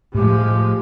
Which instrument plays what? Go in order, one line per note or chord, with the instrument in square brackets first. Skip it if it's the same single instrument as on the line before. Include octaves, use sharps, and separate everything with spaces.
[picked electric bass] A2 A3 [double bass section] F3 G#3 [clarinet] G4